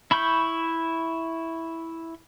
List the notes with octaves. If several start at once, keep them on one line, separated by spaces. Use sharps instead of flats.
E4 B5 C#6 G6